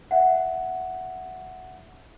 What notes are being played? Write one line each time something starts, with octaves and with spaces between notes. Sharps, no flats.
E5 F#5